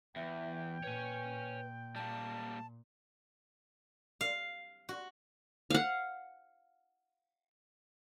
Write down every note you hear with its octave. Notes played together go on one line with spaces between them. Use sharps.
E2 E3 E5 G5
A#2 B4 C#5 G#5
G3 A#3 A5
F5
F#4
F5 F#5